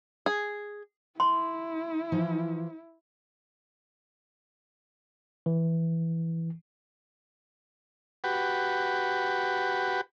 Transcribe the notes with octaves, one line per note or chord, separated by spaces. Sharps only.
G#4
E4 C6
E3 F3
E3
F#4 G4 B4